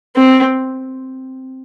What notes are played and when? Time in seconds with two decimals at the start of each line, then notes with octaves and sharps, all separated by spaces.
0.16 C4